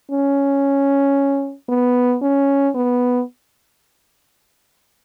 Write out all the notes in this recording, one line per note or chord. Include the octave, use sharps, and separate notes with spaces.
C#4
B3
C#4
B3